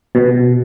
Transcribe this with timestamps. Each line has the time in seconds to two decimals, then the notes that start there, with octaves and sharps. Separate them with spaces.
0.15 B2